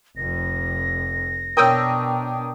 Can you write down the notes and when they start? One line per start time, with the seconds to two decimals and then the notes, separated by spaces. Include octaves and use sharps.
0.17 F1 F2 A#6
1.57 B2 D4 A#4 C#5 G5 D#6 E6